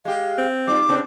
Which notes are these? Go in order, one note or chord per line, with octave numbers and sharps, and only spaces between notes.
G#3 G4 F5
C4
G3 D#4 F4 D6
C#3 B3 C4 D4